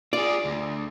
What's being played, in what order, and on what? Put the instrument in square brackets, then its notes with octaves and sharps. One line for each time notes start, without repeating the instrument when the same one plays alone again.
[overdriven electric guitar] F4 G#4 [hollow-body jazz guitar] D5
[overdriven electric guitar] D2